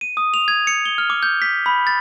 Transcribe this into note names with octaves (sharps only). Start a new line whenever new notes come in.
D#7
D#6
F7
G#6
C#7
G7
F6
D6
G6
B6
B5
A6